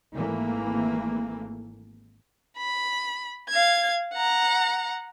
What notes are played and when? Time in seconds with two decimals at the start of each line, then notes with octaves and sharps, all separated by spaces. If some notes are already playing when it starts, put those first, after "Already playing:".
0.13 G#1 E3 A3 A#3
2.58 B5
3.49 F5 G#6
4.13 F#5 A#5